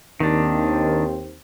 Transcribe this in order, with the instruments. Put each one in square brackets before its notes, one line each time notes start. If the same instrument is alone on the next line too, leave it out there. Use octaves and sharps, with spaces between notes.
[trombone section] D#2 C4 [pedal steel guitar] D#3 D4